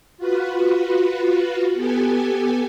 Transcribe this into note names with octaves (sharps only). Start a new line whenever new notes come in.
F4 F#4 B4
B3 G4 A4 G#5